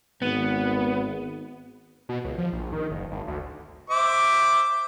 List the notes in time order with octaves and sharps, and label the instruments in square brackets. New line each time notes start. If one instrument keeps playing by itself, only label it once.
[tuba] G#1 [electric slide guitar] B3
[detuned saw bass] B2
C#2
F3
A#1
D#3
F#1
G#1
D2
[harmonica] C5 E5 D6